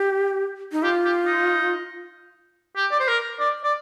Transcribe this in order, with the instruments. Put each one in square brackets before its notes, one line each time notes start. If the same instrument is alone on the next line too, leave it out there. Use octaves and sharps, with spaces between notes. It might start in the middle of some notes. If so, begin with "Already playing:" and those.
Already playing: [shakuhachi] G4
D#4
[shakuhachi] F4 [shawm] G4
[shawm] G4
D#4
G4
D5
C5
A#4
D5
D5